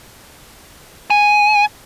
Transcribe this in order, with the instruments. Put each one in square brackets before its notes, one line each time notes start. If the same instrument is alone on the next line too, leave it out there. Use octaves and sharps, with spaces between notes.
[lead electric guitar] G#5